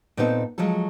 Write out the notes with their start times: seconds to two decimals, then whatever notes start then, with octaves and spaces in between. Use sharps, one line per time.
0.17 A#2 B3 C4 D#4 A4
0.58 F3 F#3 G#3 F4 A4